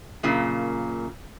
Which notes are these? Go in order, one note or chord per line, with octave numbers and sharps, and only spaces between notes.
F#2 A#2 C#3